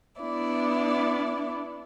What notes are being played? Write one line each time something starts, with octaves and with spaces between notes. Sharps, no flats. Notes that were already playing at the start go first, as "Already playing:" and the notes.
B3 D4 E4 D5